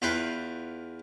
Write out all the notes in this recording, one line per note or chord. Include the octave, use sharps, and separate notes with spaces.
E2 F4 B4 G5